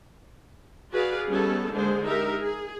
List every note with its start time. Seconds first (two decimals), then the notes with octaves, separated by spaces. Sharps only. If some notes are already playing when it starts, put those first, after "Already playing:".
0.91 F#4 G#4 B4 D5 F5
1.28 G3 B3 C#4 D#4 G#4 A4
1.72 D3 G#3 A#3 G#4 C5
2.04 D#4 G4 A#4 E5
2.39 G#4